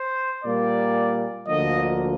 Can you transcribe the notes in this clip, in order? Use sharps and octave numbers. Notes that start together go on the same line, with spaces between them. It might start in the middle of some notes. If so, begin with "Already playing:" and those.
Already playing: C5
A#2 G3 A#3 D5
D2 D3 F3 A#3 D#5